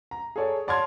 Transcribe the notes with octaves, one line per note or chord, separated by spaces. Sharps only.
A#5
G#4 A4 C#5 D5
C#5 D5 A5 C6 F6 G#6